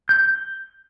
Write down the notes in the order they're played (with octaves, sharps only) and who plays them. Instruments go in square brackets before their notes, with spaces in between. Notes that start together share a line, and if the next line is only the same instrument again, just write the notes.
[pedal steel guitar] G6